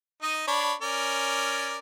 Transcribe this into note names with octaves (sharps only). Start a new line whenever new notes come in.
D#4 D#5
D4 C#5 B5
C#4 A#4 D5